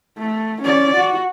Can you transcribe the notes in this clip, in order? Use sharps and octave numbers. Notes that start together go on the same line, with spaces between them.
A3
C#4 D5
F#4